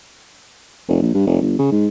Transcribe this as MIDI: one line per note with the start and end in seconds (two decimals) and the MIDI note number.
0.88 0.98 29
1.02 1.14 34
1.14 1.25 43
1.27 1.39 29
1.42 1.58 31
1.59 1.67 49
1.71 1.88 44